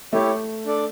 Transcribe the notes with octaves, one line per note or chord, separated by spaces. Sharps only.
A3 E4 G4 C#5
D4 A4 D5